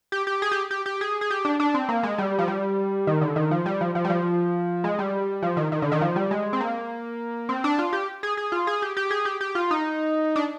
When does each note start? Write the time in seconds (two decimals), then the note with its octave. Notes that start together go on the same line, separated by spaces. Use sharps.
0.12 G4
0.27 G4
0.42 G#4
0.52 G4
0.71 G4
0.86 G4
1.01 G#4
1.21 G#4
1.30 G4
1.45 D4
1.60 D4
1.74 C4
1.89 A#3
2.03 G#3
2.18 G3
2.38 F3
2.48 G3
3.07 D#3
3.21 D3
3.36 D#3
3.51 F3
3.66 G3
3.81 F3
3.95 F3
4.05 G3
4.10 F3
4.84 G#3
4.99 G3
5.43 F3
5.57 D#3
5.72 D#3
5.82 D3
5.92 D#3
6.01 F3
6.16 G3
6.31 G#3
6.53 C4
6.61 A#3
7.49 C4
7.64 D4
7.79 F4
7.93 G4
8.23 G#4
8.37 G#4
8.52 F4
8.67 G#4
8.82 G4
8.97 G4
9.11 G#4
9.25 G4
9.41 G4
9.55 F4
9.71 D#4
10.36 D4